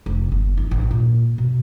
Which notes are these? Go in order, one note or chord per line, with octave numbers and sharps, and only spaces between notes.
F1
G1
E4
A1
A#2
B2